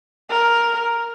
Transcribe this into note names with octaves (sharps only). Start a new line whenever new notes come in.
A#4